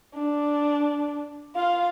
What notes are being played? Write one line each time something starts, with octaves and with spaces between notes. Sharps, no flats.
D4
F4 F5